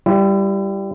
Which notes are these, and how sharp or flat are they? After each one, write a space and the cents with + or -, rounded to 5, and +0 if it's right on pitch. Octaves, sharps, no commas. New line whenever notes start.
G3 +0 E4 +35